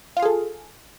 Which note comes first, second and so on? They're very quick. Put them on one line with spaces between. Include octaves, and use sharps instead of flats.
F4 F5 G#4 A4